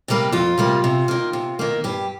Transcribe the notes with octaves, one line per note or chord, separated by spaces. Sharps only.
C3 G3 A#3
F2 F4
C3 G3 A#3
C3
D#3 A#3
C3
D#3 A#3
G2 G4